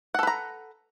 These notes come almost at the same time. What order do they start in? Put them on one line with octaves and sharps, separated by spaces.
F#5 A4 B4 A#5